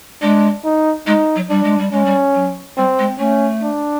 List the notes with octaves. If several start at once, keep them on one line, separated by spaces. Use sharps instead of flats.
G#3 D4
D#4
G#3 D#4
F#3
G3 D4
G#3
G3
G#3 C#4
G3
F#3
G3 C4
G#3
A3 C#4
D4